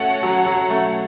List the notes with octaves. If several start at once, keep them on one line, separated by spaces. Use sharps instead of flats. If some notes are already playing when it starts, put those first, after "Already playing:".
Already playing: A3 C#4 F#4 A4 C#5 F#5
F#3
F#3
A3